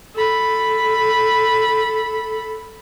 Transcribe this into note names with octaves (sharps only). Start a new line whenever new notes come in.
A4 B5